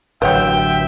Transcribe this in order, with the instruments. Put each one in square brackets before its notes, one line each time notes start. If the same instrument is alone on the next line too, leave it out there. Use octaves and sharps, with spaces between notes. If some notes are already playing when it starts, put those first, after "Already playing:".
[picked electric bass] A1 D3 F#3 [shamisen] B4 C#5 F#5 [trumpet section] E5 G5